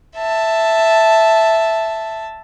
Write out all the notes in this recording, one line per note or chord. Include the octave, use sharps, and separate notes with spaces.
E5 A5